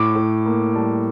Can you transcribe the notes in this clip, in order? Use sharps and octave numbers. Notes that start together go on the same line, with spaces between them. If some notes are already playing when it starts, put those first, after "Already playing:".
Already playing: A2 D6
A2
A#3
G3 A5